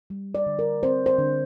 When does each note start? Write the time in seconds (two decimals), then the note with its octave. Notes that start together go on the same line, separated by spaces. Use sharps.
0.10 G3
0.35 D5
0.46 D3
0.59 A#4
0.83 C4 C5
1.06 C5
1.19 D3